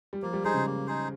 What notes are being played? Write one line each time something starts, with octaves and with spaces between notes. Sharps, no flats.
G3
F3 A#3
G3
G#3 D#4 G#4 C5
C#3
A#3
D#4 G#4 C5